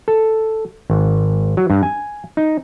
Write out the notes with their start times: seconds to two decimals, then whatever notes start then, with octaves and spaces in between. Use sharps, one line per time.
0.08 A4
0.90 G#1
1.57 F#3
1.70 G2
1.83 G#5
2.37 D#4